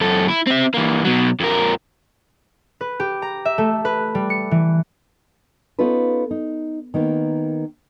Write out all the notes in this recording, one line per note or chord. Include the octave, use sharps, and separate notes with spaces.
F#2 A4
E4
C4 E5
E3 A#3
B2 F#3
F2 A#4
B4
G4
A#5
E5
A3
B4
G3
C#7
E3
B3 C#4 D#4 F4 A4 B4
D#4
D#3 A#3 B3 D#4